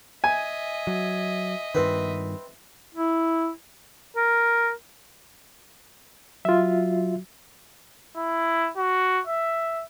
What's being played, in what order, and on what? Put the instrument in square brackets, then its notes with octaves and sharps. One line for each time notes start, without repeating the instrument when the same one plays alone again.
[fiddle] D#5 E5 [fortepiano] G#5
[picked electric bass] F#3
[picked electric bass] G2 D#3 [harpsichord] C4 B4
[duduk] E4
[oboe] A#4
[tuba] F#3 [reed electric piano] F4 E5
[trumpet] E4
F#4
E5